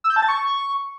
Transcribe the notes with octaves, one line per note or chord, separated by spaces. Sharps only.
E6
G6
A5
A6
C#6